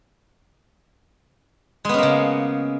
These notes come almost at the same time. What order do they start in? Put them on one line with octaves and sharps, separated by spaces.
G#3 B3 C#4 A#3 C#3